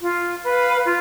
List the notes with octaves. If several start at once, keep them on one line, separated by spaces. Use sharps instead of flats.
F4
B4 F5
F4